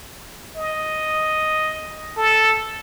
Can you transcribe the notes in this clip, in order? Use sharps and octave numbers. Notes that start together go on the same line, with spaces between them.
D#5
A4